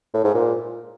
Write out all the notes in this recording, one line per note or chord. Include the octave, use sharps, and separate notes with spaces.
A2
G#2
A#2